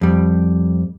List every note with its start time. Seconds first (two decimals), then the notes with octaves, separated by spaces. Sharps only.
0.01 F2 G3